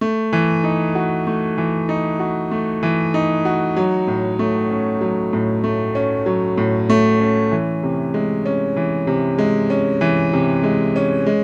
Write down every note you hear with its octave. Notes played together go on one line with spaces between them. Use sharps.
A3
E3
D#4
F#4
A3
E3
D#4
F#4
A3
E3
D#4
F#4
F#3
A2
A3
C#4
F#3
A2
A3
C#4
F#3
A2
A3
C#4
E3
C3
G#3
C#4
E3
C3
G#3
C#4
E3
C3
G#3
C#4
G#3